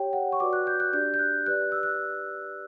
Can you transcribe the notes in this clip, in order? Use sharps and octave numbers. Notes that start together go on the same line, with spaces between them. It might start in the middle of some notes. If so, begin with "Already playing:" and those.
Already playing: G4 C#5 G5
F#5
C#6
F#4 B4 D5 D6
F#6
G6
F#6
D4 G4 D5 G6
G6
F#6
G4 B4 D5 F#6
E6
F#6